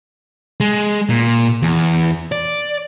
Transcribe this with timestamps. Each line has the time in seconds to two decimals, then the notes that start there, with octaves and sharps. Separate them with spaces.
0.60 G#3
1.09 A#2
1.62 E2
2.32 D5